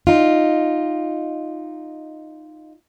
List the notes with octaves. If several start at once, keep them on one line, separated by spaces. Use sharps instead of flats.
D#4 F4